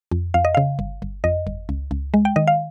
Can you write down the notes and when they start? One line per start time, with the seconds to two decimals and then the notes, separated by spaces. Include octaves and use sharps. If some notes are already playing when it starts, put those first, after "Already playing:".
0.11 F2
0.34 F2 F5
0.45 D#5
0.55 C#3 F5
0.79 G1
1.02 G1
1.24 F2 D#5
1.47 G1
1.69 C#2
1.91 C#2
2.14 G#3
2.25 G5
2.36 D#3 D#5
2.47 F5